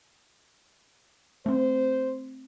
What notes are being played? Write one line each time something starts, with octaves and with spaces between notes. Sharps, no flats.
A3 C4 C5